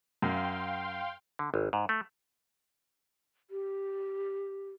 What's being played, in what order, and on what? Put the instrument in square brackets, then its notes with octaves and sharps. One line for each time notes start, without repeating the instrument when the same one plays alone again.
[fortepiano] F#2 [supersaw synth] F5 G5 C6
[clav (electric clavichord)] D3
G#1
G#2
A3
[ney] G4